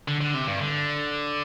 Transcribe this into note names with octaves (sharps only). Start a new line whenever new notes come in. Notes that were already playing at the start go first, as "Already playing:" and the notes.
D3
D3
C3
G2
D3